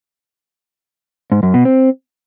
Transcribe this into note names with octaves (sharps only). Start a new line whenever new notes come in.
G#2
F#2
B2
C4